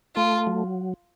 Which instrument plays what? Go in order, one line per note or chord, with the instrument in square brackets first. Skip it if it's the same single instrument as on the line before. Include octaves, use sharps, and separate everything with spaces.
[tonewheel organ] A3 [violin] F4
[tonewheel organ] F#3